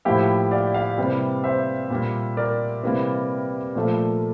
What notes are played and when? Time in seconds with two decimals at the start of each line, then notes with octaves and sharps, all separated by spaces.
0.05 A2 F3 A#3 E4 G4
0.51 D5 F5
0.74 D5 F5
0.98 C3 E3 G3 A#3
1.44 C5 E5
1.90 A#2 G3 A#3
2.37 A#4 D5
2.83 C3 E3 G3 A#3
3.75 A#2 F3 A3